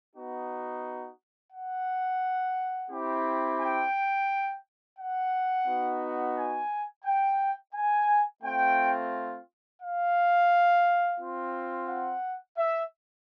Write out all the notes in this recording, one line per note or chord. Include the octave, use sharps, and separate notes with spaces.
B3 D#4 F#4
F#5
C4 E4 G4
G5
F#5
B3 D#4 F#4
G#5
G5
G#5
A3 C4 F4 G5
F5
C4 F4
F#5
E5